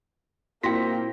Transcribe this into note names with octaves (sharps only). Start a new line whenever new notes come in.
A#2 A#3 C4 E4 F#4 G5 A#6 B6